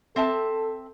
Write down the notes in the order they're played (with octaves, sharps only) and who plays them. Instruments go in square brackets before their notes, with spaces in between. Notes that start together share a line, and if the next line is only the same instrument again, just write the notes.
[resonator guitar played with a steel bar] C4 E5 A5 [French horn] A4